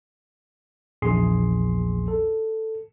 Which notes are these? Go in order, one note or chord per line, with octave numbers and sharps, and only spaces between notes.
A#1 E2 G#4 C6 C7
A4